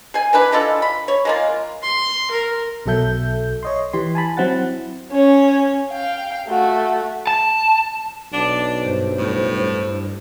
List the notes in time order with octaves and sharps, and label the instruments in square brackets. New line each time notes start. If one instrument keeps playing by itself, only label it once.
[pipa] G#4 G#5
E3 D4 B4
G#3 D4 F4 A4
B5
C#5
G#3 A#3 F4
[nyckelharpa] C6
A#4
[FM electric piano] B1 B2 F#3 A4 E5 G6
C#5 D#5 C6
E3 G4 C6
G#5 A5 B5
F#3 C4 E4 F#5 A6
[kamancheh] C#4 C#5
F5 G5
A3 F#4
[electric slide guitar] A5
[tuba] B1 [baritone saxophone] D4 [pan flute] D6
[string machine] G2 [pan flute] C5
[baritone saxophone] A2